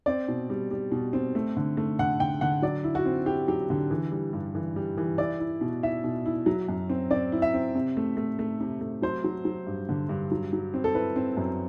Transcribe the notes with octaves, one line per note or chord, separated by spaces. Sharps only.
C4 D5
B2
G3
G3
B2
C4
A3
D3
A3
D3 F#5
D3 G5
D3 F#5
F#3 D5
E4
F#4
C4
E4 G4
F#3 G4
D3
E3
G3
G2
E3
G3
E3
E4 D5
E4
B2
E4 E5
B2
E4
F#3
F#2
C4
C4 D5
E4
E5
C4
C3
A3
A3
A3
C3
A3
F#3 C5
F#3
F#3
G2
D3
G2
F#3
F#3
C4
A4
E4 B4
C4
F#2